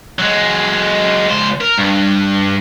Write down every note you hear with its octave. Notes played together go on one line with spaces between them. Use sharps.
F#3 G#3
C#2 C5
A#4
G2